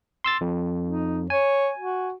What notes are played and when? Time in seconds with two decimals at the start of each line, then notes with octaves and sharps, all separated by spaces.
0.24 C6 E6 A6
0.41 F2
0.86 D#4
1.30 C#5 G#5
1.79 F#4